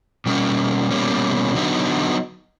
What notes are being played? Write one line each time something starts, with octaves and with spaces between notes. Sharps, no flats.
B2 G3 A#3 C#4
B2 G3 A#3 C#4
D3 F#3 B3 D#4